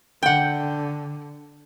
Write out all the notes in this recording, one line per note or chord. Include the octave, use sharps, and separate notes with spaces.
D3 F#5 G5